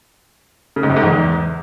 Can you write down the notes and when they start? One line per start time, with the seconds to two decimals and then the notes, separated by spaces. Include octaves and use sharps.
0.76 C#3
0.83 G#2
0.90 F#2
0.96 G#2
1.03 E2